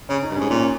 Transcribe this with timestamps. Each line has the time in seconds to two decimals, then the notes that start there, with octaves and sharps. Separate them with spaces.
0.09 C#3 C#5
0.23 D#4
0.31 G2
0.37 G#2 C#4
0.50 A#2 C#4